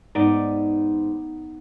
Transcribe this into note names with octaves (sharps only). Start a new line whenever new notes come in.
G#2 B3 D#4 D5